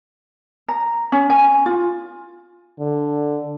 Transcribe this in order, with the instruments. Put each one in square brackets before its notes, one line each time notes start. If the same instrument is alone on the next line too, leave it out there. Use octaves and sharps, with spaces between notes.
[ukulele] A#5
C#4
G#5
F4
[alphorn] D3